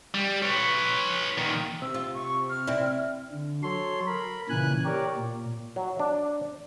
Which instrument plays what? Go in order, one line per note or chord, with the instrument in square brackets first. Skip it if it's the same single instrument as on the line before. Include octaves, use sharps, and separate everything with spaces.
[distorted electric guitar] G3
B4 C#5
A#2 D#3
[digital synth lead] C3 [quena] E6
[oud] F4
[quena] C#6
F6
[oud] C4 E4 [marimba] D5 E5
[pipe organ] D3
F#3 A4 C#5 C6
A#4 B5
A#2 C#3 E3 G#5 F#6
G4 A#4 C#5 D5
A#2
[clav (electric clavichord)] F#3
D4